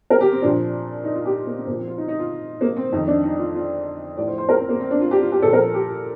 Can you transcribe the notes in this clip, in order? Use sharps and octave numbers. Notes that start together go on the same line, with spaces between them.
A#4
G4
C4
A#2 F3 D4
D#4
F4
G4
A#3
C4
A#2 F3 A#3
C4
F4
D#4
D#4
F4
A#3
C4
F2 D#3 D#4
D4
D#4
F4
F4
A2 F3 D5
C5
C5
A#4
C4
A#3
C4
D4
F4
G4
F4
G4
A#2 F3 A4
A#4
G4
F4